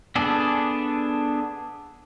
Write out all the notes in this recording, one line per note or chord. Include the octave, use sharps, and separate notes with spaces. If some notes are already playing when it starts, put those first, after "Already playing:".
B3 D4 G#4 A4